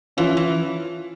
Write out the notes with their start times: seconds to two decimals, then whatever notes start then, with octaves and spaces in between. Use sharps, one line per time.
0.17 E3 F3 C#4 F4
0.37 E3